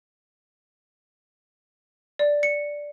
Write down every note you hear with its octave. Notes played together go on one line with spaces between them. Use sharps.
D5
C#7